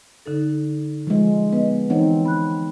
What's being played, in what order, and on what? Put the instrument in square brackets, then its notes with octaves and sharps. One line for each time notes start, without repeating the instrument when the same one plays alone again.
[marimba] D3 D#4 A4
[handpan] F3 G#3
[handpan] B3 [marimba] B4 D#5
[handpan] E3 C4 D#4 [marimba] C#5 F#5
[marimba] B5 F#6